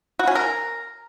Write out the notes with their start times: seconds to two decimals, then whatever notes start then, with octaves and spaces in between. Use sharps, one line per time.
0.19 F#4
0.27 C#4
0.35 A#4